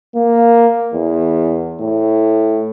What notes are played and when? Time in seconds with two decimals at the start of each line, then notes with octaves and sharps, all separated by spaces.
0.15 A#3
0.93 E2
1.80 A2